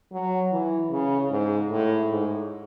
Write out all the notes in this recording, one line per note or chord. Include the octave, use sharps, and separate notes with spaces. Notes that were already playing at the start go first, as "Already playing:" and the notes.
F#3
E3
C#3
G#2
A2
G#2